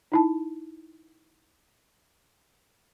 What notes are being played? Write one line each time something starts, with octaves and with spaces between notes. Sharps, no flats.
D#4 E4 A5